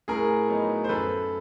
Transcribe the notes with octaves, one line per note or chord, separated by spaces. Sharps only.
A2 G#4 A#4
F#3 B3 D#4
C5
F#2 A4 B4